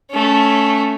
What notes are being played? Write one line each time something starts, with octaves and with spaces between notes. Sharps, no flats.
A3 C#4